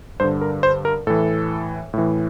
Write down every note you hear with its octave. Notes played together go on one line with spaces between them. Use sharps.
G2 D3 C5
A#4
C5
A#4
A2 E3 A4
A2 E3